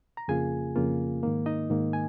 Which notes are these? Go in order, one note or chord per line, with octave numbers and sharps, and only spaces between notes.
A#5
F2 C#3 A#3 F4 G#4 G#5
F2 C#3 A#3 F4
G#2 D#3 A#3
D#4 D#5
G#2 D#3 A#3
G#5